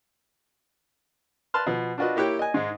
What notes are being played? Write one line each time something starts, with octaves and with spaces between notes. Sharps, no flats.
B4 A5 C6 F6
B2 F3 B3
D4 F4 F#4 B4 D#5
A#3 E4 G4 C#5 G5
D#5 G#5
G#2 G#3